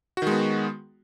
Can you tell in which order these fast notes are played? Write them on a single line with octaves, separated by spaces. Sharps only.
F#4 D#3 G#3 B3